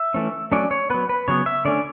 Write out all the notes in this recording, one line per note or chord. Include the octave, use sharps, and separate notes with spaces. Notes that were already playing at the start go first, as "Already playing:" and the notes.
Already playing: E5
E3 A3 C#4
F#3 A3 C#4 D5
C#5
F#3 B3 B4
B4
C#3 F#3 B3 C#5
E5
D3 A3 C#4 D5